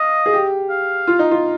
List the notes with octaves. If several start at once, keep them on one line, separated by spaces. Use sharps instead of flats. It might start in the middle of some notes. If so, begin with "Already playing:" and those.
Already playing: D#5 F5
G#4
G4
F5
F4
D#4
F4